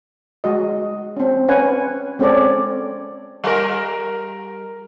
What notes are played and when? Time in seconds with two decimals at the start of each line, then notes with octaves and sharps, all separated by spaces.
0.44 G#3 F#4 D#5
1.17 C4 C#4
1.48 C#4 B4 F#5 G#5
2.19 G#3 C4 C#4 A4 C#5 D5
3.44 G3 A#4